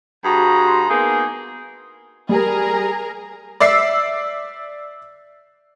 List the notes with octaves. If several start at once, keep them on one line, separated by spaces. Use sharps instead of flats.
G2 F#4 G#4 A#5 C6
A#3 B3 D#4 G#4
G3 G#4 A#4 A#5
D5 E5 E6 C7